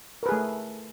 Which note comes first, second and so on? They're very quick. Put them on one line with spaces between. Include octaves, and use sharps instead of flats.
A#4 B4 G#4 A3